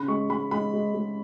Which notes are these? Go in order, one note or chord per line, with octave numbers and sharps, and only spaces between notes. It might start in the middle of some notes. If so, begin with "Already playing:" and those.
Already playing: C#3 B5
G#3 C#6
G#3 B5
G#3 B5
G#3
G#3